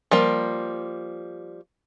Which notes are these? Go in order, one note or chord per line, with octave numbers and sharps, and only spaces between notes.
F3 G3 A#3